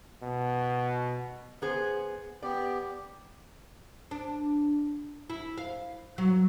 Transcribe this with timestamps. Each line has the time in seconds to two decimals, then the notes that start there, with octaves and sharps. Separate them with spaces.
0.23 B2
1.62 B3 G#4 C5
2.43 B3 G4 D5
4.11 D4
5.30 E4
5.58 F5
6.18 F#3